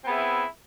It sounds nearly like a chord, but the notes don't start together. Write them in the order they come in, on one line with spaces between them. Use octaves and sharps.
C4 B3 G#4 E5 E4